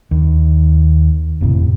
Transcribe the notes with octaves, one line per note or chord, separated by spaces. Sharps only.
D#2
G#1 F2 A2 C3